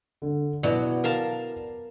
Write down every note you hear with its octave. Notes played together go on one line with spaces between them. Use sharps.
D3
B2 F#3 E4 D5
A#4 F5 A5